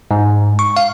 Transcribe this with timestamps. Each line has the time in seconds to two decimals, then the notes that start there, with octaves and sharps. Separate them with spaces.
0.11 G#2
0.59 C#6
0.77 F5